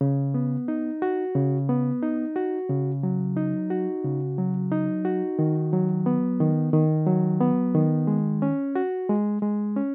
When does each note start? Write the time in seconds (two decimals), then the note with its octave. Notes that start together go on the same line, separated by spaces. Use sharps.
0.01 C#3
0.34 B3
0.68 D#4
1.02 F#4
1.35 C#3
1.69 B3
2.02 D#4
2.36 F#4
2.70 C#3
3.03 F#3
3.37 D#4
3.70 F#4
4.04 C#3
4.38 F#3
4.71 D#4
5.05 F#4
5.39 D#3
5.73 F#3
6.06 B3
6.40 D#3
6.73 D#3
7.06 F#3
7.41 B3
7.75 D#3
8.07 G#3
8.42 C#4
8.75 F#4
9.09 G#3
9.42 G#3
9.76 C#4